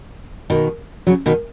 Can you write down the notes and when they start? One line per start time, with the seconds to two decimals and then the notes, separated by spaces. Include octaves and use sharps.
0.50 B2 D#3
1.07 C#3 F#3
1.26 B2 D#3